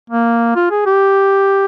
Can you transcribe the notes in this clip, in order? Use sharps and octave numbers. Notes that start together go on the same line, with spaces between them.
A#3
F4
G#4
G4